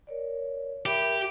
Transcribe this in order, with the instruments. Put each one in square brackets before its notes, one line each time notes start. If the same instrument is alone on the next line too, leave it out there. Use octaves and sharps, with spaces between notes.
[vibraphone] A#4 C#5 D5
[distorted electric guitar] G4 [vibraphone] A#4 E5 B5